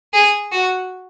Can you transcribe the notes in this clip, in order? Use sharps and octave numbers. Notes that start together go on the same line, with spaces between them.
G#4
F#4